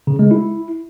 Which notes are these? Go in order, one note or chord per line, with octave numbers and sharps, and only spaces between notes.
C#3
G#3
E4